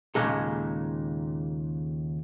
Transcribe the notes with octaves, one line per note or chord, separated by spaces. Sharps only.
D#2 A#2 C#3 G#3 A4